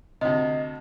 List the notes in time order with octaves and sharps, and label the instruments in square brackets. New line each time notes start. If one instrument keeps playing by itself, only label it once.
[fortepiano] D2 C3 [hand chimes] D#5